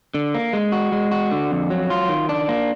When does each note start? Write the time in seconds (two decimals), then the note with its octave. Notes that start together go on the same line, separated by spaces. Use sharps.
0.14 D3
0.34 A#3
0.53 G#3
0.72 F#4
0.92 G#3
1.11 F#4
1.32 D3
1.51 F2
1.70 F#3
1.90 F4
2.09 D#3
2.29 D4
2.49 A#3